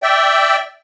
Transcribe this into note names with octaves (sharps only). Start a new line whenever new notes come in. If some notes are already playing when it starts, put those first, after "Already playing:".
D5 E5 G5